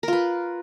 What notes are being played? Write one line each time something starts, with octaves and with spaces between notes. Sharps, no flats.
F4 A#4 B4